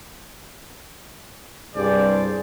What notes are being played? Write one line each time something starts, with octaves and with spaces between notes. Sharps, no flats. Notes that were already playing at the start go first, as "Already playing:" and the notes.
C2 G2 G#4 C5 D5